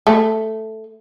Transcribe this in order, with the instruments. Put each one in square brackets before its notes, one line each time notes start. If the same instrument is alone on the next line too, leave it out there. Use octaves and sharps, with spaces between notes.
[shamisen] A3